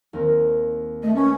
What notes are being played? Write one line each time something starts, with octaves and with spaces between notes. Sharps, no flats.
D#2 C4 A#4
A3 D#5
C#4 B4 C#6